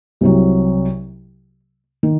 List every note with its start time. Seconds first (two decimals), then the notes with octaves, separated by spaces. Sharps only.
0.21 C2 C3 F#3
2.03 D#3